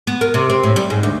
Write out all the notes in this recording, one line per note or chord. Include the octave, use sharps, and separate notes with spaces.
B3
A#4
C3
C4
A2
G3
G#2
D2